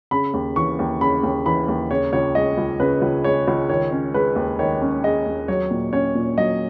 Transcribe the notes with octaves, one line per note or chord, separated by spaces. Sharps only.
C#3 B5
D#2
E3 C#6
D#2
C#3 B5
D#2
E3 B5
D#2
C#3 C#5
C#2 C#5
G#3 D#5
C#2
C#3 B4
C#2
G#3 C#5
C#2
D#3 C#5
C#4
G#3 B4
D#2
D#3 C#5
C#4
G#3 D#5
D#2
F#3 C#5
A#2
C#4 C#5
A#2
F#3 D#5